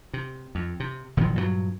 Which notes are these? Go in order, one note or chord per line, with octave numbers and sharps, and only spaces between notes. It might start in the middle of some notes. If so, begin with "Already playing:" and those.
C3
F2
C3
F#1 A#2 D#3 F3
G2 A#2 D3 F#3